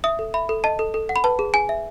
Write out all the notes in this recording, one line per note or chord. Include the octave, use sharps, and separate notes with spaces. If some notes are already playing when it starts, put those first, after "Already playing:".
E5 D#6
A4
E5 B5
A4
D#5 A5
A4
A4
F#5
B5
B4 A5
G#4
G#4 G#5
E5